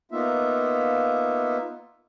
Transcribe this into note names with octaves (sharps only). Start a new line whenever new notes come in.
A#3 B3 D#4 F4 E5